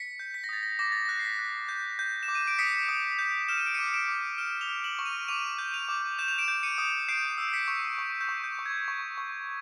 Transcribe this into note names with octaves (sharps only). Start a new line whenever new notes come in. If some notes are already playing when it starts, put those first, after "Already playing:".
Already playing: B6 C#7
G6
B6
A#6
D#6 A6
A#6
D6 A#6
A6
F#6 A#6
C7
B6
F#6
G6
G6
E7
D6
D#7
D7
D#6 B6 C#7
D#6
G6
F6 E7
D#7
D7
D6 C#7 D#7
D7 E7
D6
F6 D7 E7
F7 G7
F6
E7 F#7
C#6
D#7 F7
D6 D#7 F7
G6
D#7 F7
D6
G6 E7
F7
D7 E7
G6
C#7 D#7
D#6
G6 C7 D7
E6
C7
B6 C#7
C#6
C#6
G6
C#6
G6
C#6
G#6
C#6
C#6